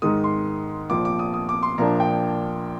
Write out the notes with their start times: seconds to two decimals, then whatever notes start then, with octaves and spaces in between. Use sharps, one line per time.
0.02 G#2 D#3 G#3 D#6
0.24 C6
0.90 A#1 A#2 F3 D6
1.05 D6
1.19 D#6
1.34 D#6
1.49 D6
1.63 C6
1.78 A#1 A#2 F3 A#3 D4 A#5
2.00 G5